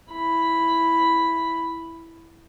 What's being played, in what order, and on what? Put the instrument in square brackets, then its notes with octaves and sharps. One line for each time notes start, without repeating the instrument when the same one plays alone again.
[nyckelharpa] E4 B5